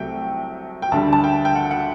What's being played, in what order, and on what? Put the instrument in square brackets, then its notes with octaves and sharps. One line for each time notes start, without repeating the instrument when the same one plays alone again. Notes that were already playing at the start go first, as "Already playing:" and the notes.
Already playing: [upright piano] C2 C3 F#3 A3 G5
G5
D2 D3 G3 A5
A5
G5
G5
F#5
F#5